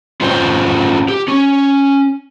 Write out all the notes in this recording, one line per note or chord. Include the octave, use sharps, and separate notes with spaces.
C#4 F4 F#4 C5 C#5 G5
G4
C#4